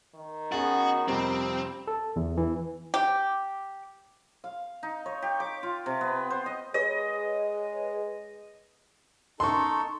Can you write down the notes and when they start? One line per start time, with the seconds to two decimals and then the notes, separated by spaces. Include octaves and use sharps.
0.15 D#3
0.52 B3 C#4 F#4 G#4 A6
1.08 F2 C3 G3 C4
1.88 A4
2.16 E2
2.37 E3
2.94 G4
4.44 F5
4.83 D#4
5.06 C#5
5.22 G4
5.40 D6
5.63 F4
5.86 C3
6.01 B3
6.30 C5
6.46 D#5
6.74 G#3 G#4 B4 C#5 D#5
9.40 D#4 A4 C6 C#6